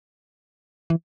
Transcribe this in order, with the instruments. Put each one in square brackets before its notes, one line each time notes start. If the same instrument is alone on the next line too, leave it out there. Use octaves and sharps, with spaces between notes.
[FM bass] E3